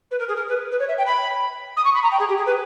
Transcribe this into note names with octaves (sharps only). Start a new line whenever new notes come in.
B4
A#4
G#4
A#4
B4
B4
C#5
E5
G5
B5
D#6
C#6
B5
A#5
G5
G#4
G4
G#4
B4